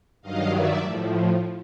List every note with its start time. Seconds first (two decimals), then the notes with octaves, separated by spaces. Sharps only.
0.21 G2 D#3 F#3 D#5 F5
0.51 D5 E5
0.80 A2 F3